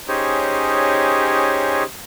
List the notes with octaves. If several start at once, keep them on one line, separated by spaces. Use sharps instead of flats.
C#4 D#4 G4 G#4 C5 C#5